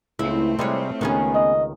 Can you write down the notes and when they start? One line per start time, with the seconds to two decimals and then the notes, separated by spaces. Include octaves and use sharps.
0.19 C#2 A3 C4 E4
0.59 C3 G3 G#3 F4 B4 C#5
1.01 C#2 D#3 B3 C#4 G#4
1.35 D#5